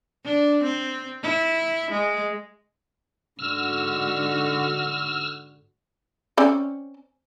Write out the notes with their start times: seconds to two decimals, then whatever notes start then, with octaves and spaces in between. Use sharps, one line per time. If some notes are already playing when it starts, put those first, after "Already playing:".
0.25 D4
0.63 C4
1.23 E4
1.91 G#3
3.39 G#2 D3 F#4 E6 F6
6.37 C4 C#4 D5